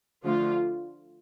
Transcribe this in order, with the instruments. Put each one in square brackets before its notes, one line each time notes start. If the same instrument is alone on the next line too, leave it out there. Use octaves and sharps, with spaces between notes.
[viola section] D3 F3 A3 F4